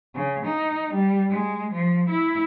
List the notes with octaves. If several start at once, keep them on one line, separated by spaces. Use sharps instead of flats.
C#3
D#4
G3
G#3
F3
E4